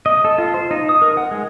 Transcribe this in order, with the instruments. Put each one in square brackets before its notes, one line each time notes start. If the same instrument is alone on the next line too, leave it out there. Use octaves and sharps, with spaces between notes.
[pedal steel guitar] D#5
A4
F4
C5
D#4
D#6
A#4
F#5
G#3